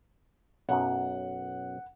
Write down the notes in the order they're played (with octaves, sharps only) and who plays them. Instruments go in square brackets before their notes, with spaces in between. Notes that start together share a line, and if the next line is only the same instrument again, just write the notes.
[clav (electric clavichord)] B1 F#2 [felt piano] F#5